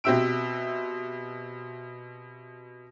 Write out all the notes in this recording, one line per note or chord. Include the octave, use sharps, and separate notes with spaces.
B2 C4 G4 E5 E6 D7